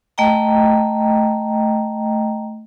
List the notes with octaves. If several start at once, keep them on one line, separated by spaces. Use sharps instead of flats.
A3 D#5 G5 A#5